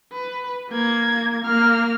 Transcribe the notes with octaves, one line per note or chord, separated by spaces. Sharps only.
B4
A#3 G#6
A#3 F6